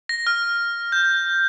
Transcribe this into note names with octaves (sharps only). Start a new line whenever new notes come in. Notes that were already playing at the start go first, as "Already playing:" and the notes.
A#6
F6
G6